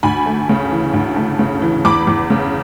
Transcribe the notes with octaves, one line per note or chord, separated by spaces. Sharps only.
D2 G#5 B5
A3
C#3
E3
D2
A3
C#3
E3
E2 B5 D6
E2
C#3